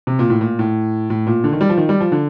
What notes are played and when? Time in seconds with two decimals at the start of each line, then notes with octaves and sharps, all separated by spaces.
0.07 C3
0.19 A#2
0.30 A2
0.41 A#2
0.59 A2
1.10 A2
1.27 A#2
1.44 D3
1.53 D#3
1.61 G3
1.69 F3
1.77 D#3
1.89 G3
2.00 F3
2.12 D3